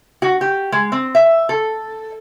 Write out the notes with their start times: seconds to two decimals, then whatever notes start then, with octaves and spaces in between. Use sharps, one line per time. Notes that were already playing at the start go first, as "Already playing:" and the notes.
0.22 F#4
0.41 G4
0.72 G#3
0.92 C4
1.15 E5
1.49 A4